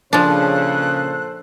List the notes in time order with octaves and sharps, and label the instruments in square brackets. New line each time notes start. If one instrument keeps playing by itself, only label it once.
[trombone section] A#2 A4 C5 [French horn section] C#3 [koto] F3 D4 [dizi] F#6